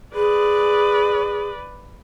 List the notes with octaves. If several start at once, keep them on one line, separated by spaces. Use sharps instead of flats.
G#4 B4 D5